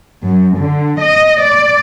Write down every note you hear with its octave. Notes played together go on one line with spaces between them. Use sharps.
F#2
D3
D#5
D5